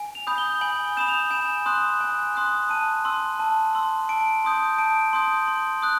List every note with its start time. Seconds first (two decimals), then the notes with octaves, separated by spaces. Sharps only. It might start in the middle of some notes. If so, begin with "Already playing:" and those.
Already playing: G#5
0.15 F7
0.27 B5 D#6 G6
0.38 G7
0.61 G#5 F#7
0.97 B5 D#6 G6 E7
1.09 F7
1.31 G#5 E7
1.66 C6 D#6 F#6
2.01 G#5
2.35 C6 D#6 F#6
2.70 A5 D#7
3.05 C6 E6
3.39 A5
3.75 C6 E6
4.09 A5 D7
4.44 C6 D#6 G6
4.78 A5 D7
5.13 C6 D#6 G6
5.48 C6
5.82 D#6 F#6